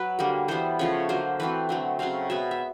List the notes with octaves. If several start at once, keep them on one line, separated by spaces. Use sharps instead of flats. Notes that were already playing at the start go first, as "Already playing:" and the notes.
Already playing: F#3 B4
D3 G3 A#3
E3 G3 B3 C5
C#3 F3 A3 C#5
D3 F#3 A#3 C5
E3 A3 C4 B4
D3 F#3 A3 C4
C#3 F#3 A3 C4 F5
B2 G#3 B3 E5
E5